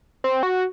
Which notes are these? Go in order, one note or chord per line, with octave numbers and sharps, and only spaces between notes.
C4
F#4